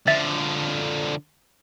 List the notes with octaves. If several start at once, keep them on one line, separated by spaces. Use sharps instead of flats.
D3 F3 E5 A6